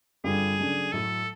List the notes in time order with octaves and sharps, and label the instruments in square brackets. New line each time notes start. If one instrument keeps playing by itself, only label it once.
[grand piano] G2 D3 G3 C4 F4 [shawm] G#4
[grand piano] C#3 F#3 A3 D4
[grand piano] A2 F#3 A3 [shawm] A4